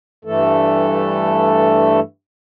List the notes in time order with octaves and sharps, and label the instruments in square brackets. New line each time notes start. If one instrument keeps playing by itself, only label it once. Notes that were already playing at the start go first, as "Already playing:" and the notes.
[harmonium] G2 E3 A3 A4